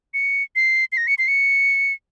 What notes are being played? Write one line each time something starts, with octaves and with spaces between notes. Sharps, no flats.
C#7
C7
C7
A#6
C#7
C7
C#7